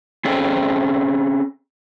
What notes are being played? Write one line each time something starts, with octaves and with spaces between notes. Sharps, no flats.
C4 C#4 G#4 A4 C5 G5